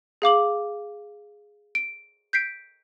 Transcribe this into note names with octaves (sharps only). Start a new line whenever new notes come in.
G#4 F5 D6 F#7
D7
G6 B6 C7 D7